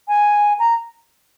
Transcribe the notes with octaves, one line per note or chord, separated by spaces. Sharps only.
G#5
A#5